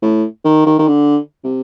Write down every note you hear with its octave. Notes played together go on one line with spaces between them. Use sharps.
A2
D#3
D#3
D#3
D3
C3